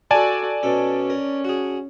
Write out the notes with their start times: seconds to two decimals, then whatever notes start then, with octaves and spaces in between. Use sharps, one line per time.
0.11 F#4 A4 D5 G#5 A5
0.63 B2 C#4 A4
1.10 A#4
1.45 F#4 G#4